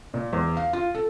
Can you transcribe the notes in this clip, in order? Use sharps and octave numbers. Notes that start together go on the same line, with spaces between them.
A#2
E2
F5
F4
A4